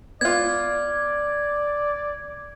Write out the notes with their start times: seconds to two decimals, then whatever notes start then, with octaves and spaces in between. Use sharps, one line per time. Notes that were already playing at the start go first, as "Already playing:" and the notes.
0.21 B3 F4 D5 G#6